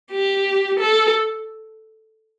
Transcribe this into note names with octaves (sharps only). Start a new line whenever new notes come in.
G4
A4